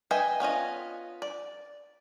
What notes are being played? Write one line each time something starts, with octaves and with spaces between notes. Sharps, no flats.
B4 D#5 E5 G5 G#5
B3 C#4 F4 D#5
D5